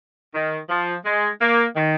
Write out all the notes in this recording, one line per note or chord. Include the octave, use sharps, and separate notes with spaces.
D#3
F3
G#3
A#3
D#3